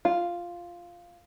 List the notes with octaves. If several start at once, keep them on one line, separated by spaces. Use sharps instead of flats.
F4